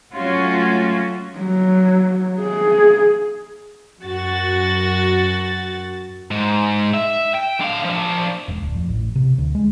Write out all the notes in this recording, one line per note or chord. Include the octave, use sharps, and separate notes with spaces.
F#3 A3 C#4 F4 F#4
F#3
G#4
F#2 F#4 A6
G#2
E5
G5
D3 F5
F3 D4
E1
D1
F2
A1
C3
D2
G#3